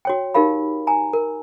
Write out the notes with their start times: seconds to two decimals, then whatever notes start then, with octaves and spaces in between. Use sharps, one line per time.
0.05 F#4 C#5 G5
0.34 D#4 G4 A#4 F5 B5
0.87 G#5 A#5
1.13 A#4